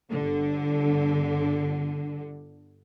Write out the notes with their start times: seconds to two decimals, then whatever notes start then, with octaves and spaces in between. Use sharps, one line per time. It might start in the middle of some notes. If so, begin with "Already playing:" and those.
0.10 G1 D3